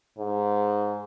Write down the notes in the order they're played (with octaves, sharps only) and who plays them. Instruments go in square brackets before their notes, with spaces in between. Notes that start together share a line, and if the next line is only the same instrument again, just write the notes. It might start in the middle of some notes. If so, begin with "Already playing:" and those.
[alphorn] G#2